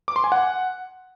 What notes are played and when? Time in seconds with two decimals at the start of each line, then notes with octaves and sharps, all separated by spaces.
0.08 D6
0.16 C6
0.24 G#5
0.32 F#5